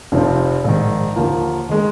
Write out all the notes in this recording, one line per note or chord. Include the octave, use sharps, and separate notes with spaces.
F1 F2 C3 F3 C4
A#1 G#2 D#3
D#2 D3 F3 A#3 F4
D#3 G#3